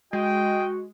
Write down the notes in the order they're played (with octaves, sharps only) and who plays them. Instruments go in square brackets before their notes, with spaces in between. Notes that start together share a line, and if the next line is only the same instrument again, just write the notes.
[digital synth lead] G#3 [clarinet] F#4 [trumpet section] D#5 G5